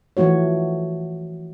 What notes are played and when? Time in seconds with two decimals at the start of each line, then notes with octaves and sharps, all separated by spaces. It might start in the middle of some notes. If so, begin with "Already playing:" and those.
0.17 E3 F3 A3 F#4 C#5